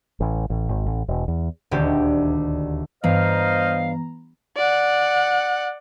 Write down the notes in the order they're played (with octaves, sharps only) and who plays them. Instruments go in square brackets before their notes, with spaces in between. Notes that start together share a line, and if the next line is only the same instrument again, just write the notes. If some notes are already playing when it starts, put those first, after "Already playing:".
[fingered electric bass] A1
A1
G#1
A1
E1
E2
[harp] D#1 D2 G4
[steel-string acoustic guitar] G2 [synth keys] E3 B3 A#5 [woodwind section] C5 D#5 F5
[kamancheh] D5 F#5